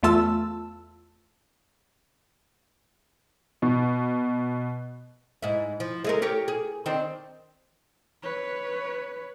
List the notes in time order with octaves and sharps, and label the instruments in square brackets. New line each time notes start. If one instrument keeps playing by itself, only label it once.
[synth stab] E2 A3 F4 A5 E6
[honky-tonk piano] B2
[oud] G#2 E4
F3
G#3 A3 A#4
G4 A#4 C#5
G#4
D#3 C4 D4
[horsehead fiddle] B4 C#5